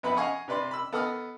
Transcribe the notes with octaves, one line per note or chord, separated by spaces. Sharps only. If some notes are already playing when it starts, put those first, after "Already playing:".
F2 B3 B4 E5 B5
D#5 F5 F#5 G#5 C#6 D#6
C3 B4 D5 C6
B5 E6
B3 A4 D#5 D#6 F6